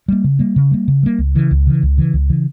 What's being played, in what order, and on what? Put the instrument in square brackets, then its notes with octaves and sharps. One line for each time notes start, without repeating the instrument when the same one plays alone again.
[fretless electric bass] G3 A#3
C#3
G3 A#3
C#3
G3 A#3
C#3
G3 A#3
C#2
C#3 E3
C#2
C#3 E3
C#2
C#3 E3
C#2
C#3 E3